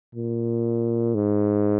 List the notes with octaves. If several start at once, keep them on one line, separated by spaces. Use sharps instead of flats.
A#2
G#2